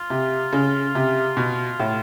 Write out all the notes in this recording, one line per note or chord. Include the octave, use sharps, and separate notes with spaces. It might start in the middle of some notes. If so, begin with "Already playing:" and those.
Already playing: F4
C3
C#3
C3
B2
A2